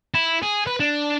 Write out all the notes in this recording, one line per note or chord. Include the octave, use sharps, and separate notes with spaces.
E4
G#4
B4
D4